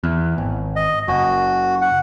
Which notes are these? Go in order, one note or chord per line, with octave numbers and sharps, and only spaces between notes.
E2
G#1
D#5
F#1 F#4
F#5